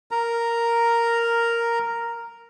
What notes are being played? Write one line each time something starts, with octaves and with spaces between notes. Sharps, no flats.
A#4 A#5